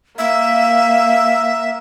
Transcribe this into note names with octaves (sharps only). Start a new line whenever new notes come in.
A#3 E5